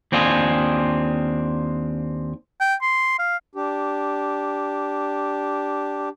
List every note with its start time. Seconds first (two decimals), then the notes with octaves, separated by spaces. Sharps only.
0.12 D#2 C4 D4 F4 G#4
2.61 G5
2.82 C6
3.19 F5
3.55 D4 G4